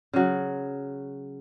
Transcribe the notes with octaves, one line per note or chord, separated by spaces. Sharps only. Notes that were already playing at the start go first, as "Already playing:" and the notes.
C#3 F#3